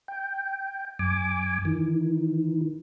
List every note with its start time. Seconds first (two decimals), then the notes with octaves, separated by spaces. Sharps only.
0.08 G5
0.99 F#2 G#5 D6
1.65 D#3 E3